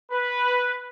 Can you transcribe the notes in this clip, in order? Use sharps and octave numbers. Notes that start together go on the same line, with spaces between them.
B4